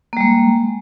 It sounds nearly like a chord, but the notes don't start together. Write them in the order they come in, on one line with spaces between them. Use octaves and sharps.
A#3 G3 G#3